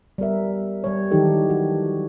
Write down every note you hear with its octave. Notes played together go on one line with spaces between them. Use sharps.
G3 B3 A#4 E5
G3 C#5
D#3 E3 F#3 D#4 G4 A4
F#4